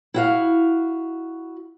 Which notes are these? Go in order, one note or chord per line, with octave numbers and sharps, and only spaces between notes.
E4 F#4 F5